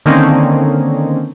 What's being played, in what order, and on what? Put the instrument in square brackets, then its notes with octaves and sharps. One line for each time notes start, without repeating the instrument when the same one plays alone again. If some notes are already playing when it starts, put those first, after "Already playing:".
[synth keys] D3 D#3 A#3 C4 C#4 D#4